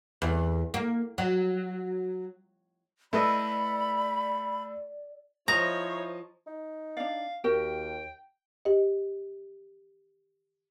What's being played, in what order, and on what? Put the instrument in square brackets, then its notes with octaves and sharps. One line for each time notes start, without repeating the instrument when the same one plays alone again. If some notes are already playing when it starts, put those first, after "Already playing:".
[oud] E2
A#3
F#3
[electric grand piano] A3 A4 [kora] E4 B4 D#5 [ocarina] D5 [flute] B5
[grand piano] F3 D#5 [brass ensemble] E4 C5 [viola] C#5 [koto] A#5
[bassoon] D#4
[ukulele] D4 D5 [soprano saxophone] F5
[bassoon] D#2 [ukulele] F#4 G4 A#4 [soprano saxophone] G5
[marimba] G4 D#5